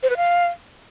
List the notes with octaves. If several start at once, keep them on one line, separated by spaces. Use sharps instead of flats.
C5
B4
F5